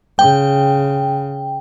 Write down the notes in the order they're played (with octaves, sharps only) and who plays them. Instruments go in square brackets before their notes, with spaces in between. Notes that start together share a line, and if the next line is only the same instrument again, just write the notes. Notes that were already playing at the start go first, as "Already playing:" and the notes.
[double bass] C#3 [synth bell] G5